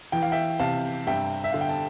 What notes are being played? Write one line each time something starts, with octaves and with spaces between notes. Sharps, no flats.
E3 G5
F5
E5 G5
C3 F5 A5
G2 E5 G5
E5
D3 F5
G5
A5